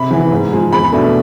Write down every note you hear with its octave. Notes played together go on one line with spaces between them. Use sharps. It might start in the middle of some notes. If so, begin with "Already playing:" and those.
Already playing: C3 B5
E3 B3
G#2
F3 G#3
E2 B5
B2 A3 D4